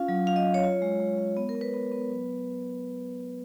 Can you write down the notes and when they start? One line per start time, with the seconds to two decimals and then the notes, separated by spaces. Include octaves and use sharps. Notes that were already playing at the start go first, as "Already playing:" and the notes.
Already playing: C#4 F4 F5
0.08 F#3
0.27 F4 F5
0.36 D#5
0.45 F#3
0.54 C#5
0.64 F4
0.82 G#3
1.00 G#3
1.18 G#3
1.37 B3
1.49 A#4
1.55 B3
1.61 B4
1.74 B3
1.92 B3
2.10 F#3